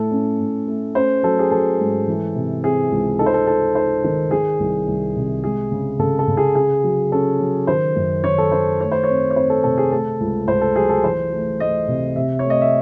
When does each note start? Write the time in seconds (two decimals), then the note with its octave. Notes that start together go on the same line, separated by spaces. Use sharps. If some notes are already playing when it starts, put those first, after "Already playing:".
Already playing: A2 A4
0.11 C#4
0.39 A2
0.68 A3
0.95 C#4 C5
1.23 F#3 A4
1.39 G#4
1.51 F#3 A4
1.80 G#2
2.07 E3
2.35 C3
2.63 C4 G#4
2.91 C#2
3.19 D#4 A4
3.26 C5
3.34 A4
3.47 D#4 A4
3.75 D#4 C5
4.04 D#3
4.31 D#3 G#4
4.60 C2
4.88 C2
5.16 C3
5.44 G#3 G#4
5.72 C#3
5.99 C#3 A4
6.19 A4
6.28 C#3
6.37 G#4
6.55 C#4 G#4
6.83 F#3
7.12 C#4 A4
7.39 F#3
7.67 D#3 C5
7.96 F#2
8.23 D#3 C#5
8.38 A4
8.52 D#3 C5
8.80 A3 C#5
8.92 C5
9.03 C4 C#5
9.30 C#5
9.35 C4 C5
9.50 A4
9.64 C3 A4
9.78 G#4
9.92 A3 A4
10.20 C#2
10.48 C#2 C5
10.61 A4
10.76 F#3 G#4
10.89 A4
11.04 E3 C5
11.32 A3
11.60 A3 D#5
11.88 C3
12.16 C3 E5
12.39 A3 C#5
12.50 D#5
12.61 E5